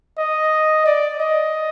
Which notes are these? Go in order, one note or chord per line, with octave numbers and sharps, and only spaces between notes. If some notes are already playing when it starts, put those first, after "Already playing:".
D#5
D5
D#5